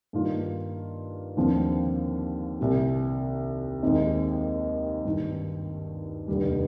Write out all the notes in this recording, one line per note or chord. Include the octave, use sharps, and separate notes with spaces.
G2 D#3 A#3 F4
D#2 D3 F3 C4
C2 C3 G3
D#2 D#3 G#3 C4 D#4
G#1 G2 D#3
F1 D#2 D3 G3